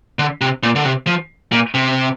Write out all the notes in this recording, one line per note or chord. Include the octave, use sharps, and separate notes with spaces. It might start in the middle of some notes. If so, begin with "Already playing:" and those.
D3
C3
A#2
D3
C3
F3
A#2
C3